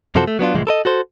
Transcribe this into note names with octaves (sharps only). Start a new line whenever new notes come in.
F#2 C3 F3 F#4 A4 C5
A3
F#3 B3 D4 F4
C2 A2 E3 F3 G#3
A4 A#4 D#5
F#4 A4 C5